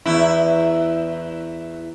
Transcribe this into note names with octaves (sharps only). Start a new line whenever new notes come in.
E2 E4